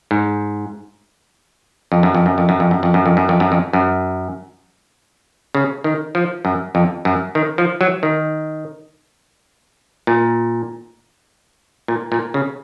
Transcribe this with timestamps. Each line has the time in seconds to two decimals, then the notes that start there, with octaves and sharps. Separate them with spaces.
0.11 G#2
1.92 F2
2.03 F#2
2.15 F2
2.26 F#2
2.38 F2
2.49 F#2
2.60 F2
2.71 F#2
2.83 F2
2.94 F#2
3.06 F2
3.17 F#2
3.29 F2
3.40 F#2
3.52 F2
3.73 F#2
5.55 C#3
5.84 D#3
6.15 F3
6.45 F#2
6.75 F2
7.05 F#2
7.35 D#3
7.58 F3
7.81 F#3
8.03 D#3
10.07 A#2
11.88 A#2
12.12 A#2
12.34 C#3